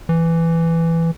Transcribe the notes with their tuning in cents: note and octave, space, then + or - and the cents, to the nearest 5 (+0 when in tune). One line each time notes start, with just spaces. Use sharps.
E3 +10